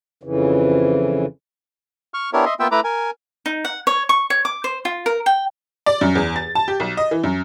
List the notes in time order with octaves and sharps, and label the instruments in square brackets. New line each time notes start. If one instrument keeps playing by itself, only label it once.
[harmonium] F2 C#3 E3
[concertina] C#6 F6
B3 D4 E4 G4 A#4 C#5
D#5 E5 C6
A#3 B3 F4 E5 G5 E6
A3 E4 B4 A#5 B5 D6
A#4 G#5
[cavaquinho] D#4
F#5
C#5
C#6
C#5
D6
C5
F4
A#4
G5
[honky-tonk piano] D5
F#2
E2
A6
A5
G4
B1
D#5
E3
F#2